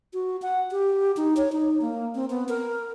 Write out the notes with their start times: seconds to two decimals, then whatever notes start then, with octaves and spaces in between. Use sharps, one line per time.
0.13 F#4
0.42 F#5
0.71 G4
1.17 D#4
1.37 C#5
1.52 D#4
1.81 A#3
2.15 C4
2.30 B3
2.49 A#4